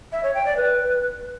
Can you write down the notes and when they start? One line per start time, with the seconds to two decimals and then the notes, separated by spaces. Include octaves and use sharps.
0.11 E5
0.23 C#5
0.34 G5
0.45 D5
0.56 B4